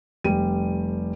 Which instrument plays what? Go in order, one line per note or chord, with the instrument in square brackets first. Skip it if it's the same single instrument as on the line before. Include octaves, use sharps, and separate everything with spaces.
[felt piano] F1 G3 D#7